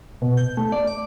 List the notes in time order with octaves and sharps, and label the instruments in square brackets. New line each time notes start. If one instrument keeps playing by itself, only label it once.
[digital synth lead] B2
G6
A3
D5
D6